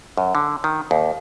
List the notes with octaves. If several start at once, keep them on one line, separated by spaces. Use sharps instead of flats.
F#2
D3
D#3
D#2